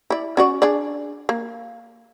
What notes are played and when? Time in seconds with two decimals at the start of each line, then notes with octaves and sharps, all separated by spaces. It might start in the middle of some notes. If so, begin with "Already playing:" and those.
0.10 E4 D5
0.37 C#4 F#4 D5
0.62 D4 G#4 D5
1.29 A#3